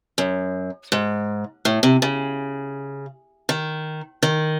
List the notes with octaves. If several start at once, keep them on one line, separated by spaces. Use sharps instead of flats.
F#2
G#2
A2
C3
C#3
D#3
D#3